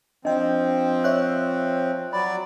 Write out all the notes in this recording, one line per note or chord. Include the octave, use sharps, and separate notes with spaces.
F3 C4 D4 D#5 G5
C#5 E5 F#6
F#3 D5 B5